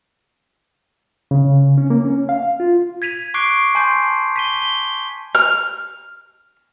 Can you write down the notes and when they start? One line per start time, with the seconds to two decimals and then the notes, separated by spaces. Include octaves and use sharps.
1.31 C#3
1.78 C#4
1.90 A#3
2.05 C#4
2.29 F5
2.60 F4
3.02 G#6 B6 D#7 F7
3.34 C#6 D6 F#6 C7 D7
3.75 G#5 A5 C6 G6 C7
4.36 B6 D#7 G7
4.62 G7
5.35 F6